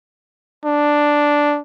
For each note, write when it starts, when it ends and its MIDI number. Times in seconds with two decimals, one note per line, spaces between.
0.65 1.60 62